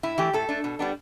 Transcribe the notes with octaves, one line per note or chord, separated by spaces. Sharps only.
A2 E4
E3 A3 G4
A2 A4
A3 D4
B2
G3 B3 D4